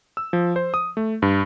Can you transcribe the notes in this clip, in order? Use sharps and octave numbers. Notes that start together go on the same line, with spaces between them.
E6
F3
C5
D#6
A3
G2